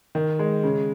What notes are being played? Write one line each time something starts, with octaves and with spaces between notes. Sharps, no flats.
D#3
G#3
C#3